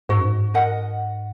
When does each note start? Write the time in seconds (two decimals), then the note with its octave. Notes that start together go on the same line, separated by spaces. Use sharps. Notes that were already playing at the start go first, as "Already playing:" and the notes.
0.09 G#2 F#4
0.18 F#2
0.25 G#2
0.54 A#4 D#5 F#5